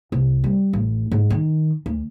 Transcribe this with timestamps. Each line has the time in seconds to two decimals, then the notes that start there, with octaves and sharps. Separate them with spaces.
0.12 C2
0.44 G3
0.73 A1
1.12 G#2
1.30 D#3
1.86 D2